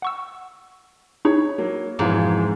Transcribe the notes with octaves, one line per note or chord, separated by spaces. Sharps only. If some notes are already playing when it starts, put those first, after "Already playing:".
F#5 C#6 E6
D#4 E4 G#4 C#5
F#3 A#3
F2 G#2 B2 E3 D6